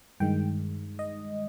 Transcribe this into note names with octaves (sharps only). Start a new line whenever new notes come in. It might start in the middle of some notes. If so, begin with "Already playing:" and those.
G2 D#3 G#3 G5
D#5